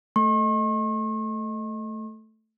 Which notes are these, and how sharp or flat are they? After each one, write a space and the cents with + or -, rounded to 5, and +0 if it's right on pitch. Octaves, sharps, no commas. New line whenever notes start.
A3 +0 C#6 -45